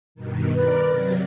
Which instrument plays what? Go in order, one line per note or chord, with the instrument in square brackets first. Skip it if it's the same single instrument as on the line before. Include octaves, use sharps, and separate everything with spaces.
[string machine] G2 B2 D#3
[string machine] A#4 D5 [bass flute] B4
[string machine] C3 F#3